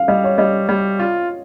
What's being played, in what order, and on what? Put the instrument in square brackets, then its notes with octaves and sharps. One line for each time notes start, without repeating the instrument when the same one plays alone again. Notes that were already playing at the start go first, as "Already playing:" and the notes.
Already playing: [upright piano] F5
[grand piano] G3 [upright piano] D#5
[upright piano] C#5
[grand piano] G3 [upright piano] D#5
[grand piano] G3
F4